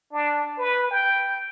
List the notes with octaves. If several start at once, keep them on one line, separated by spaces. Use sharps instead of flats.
D4
B4
G5